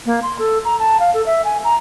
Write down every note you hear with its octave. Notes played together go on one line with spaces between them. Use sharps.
A#3
C6
A4
A#5
A5
F5
A4
E5
G#5
A#5